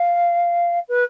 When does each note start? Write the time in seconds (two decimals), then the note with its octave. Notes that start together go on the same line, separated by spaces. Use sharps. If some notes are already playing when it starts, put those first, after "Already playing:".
Already playing: F5
0.88 B4